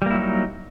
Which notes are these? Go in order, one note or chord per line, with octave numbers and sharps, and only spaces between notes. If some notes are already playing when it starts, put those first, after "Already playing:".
F#3 G3 A#3 D#4 E4